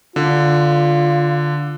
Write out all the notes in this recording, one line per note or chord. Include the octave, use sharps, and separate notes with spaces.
D3 F4